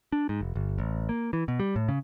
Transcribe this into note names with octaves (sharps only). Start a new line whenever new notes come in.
D4
G#2
F1
G1
A1
A#3
E3
B2
G3
A2
C#3